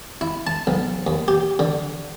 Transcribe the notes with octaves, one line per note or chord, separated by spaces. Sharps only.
E4
A5
B1
D#2
G4
D3